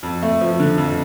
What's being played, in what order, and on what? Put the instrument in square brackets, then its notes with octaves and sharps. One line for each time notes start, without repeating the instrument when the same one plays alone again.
[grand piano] F2
A3
F3
D3
F2